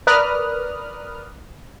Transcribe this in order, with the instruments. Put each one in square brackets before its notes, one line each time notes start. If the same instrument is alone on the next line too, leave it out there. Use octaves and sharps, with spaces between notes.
[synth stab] A#4 B4 D5 D#6 F6 F#6